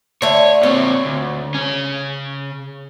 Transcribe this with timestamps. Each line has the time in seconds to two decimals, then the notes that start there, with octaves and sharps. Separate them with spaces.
0.22 D3 A3 C#5
0.63 A#2 C4 C#5
1.05 D2
1.54 C#3 C#4